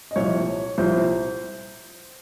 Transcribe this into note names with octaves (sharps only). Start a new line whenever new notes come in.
D#5
C2 A#2 F3 C#5
C2 A#2 F3 C5